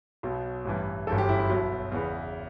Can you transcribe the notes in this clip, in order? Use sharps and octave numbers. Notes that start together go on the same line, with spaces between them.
B1 B2 F#3
A1 G2 E3
G1 F#2 E3 A4
G4
E4
E4
B1 B2 F#3
E2 C#3 E3